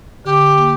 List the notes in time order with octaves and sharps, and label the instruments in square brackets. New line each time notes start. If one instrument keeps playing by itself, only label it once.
[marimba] D3 [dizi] G4
[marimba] D3
A#3